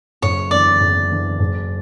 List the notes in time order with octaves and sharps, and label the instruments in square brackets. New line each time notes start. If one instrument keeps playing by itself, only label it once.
[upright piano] F#1 [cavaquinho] C#5
[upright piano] E2 D3 [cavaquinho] D5
[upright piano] F#1
E2 D3
F#1